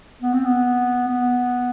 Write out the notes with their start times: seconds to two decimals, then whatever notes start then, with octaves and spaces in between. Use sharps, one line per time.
0.22 B3
0.34 C4
0.45 B3
1.07 B3